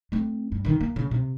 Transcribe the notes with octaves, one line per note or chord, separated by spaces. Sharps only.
A3 C4
G2
D3 D#3
A#3
C#3
C3